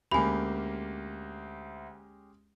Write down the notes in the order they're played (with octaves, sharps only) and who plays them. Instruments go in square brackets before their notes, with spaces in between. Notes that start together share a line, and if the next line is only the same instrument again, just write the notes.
[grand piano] D2 A#3 [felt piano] G#3 C#4 G4 [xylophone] G#5 B5